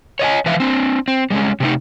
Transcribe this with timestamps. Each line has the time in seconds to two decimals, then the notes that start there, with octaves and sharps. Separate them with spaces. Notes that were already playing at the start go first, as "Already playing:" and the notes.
0.19 C#5 D#5 F#5 G#5
0.46 E3 F3 B4 E5 F5
0.60 C4 D4
1.08 C4
1.30 G3 G#3 C#4
1.60 C3 A3 D#4